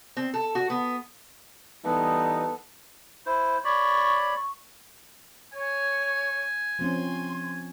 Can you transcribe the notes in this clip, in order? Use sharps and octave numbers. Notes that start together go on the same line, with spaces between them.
C4
A4
F#4
B3
E3 G3 B3 D#4 A4
E4 C5
C#5 D5 B5 C#6
C#6
C#5 G#5
F3 C4 C#4 C6